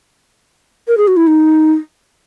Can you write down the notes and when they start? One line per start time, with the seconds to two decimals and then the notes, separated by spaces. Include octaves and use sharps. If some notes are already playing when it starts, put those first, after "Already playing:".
0.88 A#4
0.97 G#4
1.08 F#4
1.17 E4
1.27 D#4